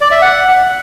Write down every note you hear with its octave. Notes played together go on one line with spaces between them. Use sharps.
D5
E5
F#5